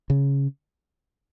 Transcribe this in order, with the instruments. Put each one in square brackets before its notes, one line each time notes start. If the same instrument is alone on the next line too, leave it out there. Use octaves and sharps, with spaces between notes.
[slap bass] C#3